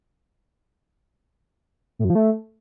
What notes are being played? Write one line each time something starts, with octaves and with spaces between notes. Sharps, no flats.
A2
F#2
F3
A3